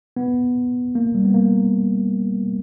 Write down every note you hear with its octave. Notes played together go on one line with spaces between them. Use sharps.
B3
A#3
G3
B3
A#3